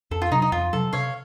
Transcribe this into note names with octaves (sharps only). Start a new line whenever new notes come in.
F2 A4
F4
C3 F#3 D#4
D#4
F2 F4
C3 F#3 A4
C3 C#5 F5